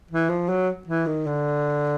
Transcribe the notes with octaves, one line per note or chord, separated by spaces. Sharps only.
E3
F3
F#3
E3
D#3
D3